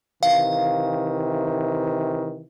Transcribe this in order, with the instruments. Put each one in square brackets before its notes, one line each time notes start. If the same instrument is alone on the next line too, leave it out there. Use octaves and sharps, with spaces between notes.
[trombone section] C3 D#3 E3 [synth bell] F5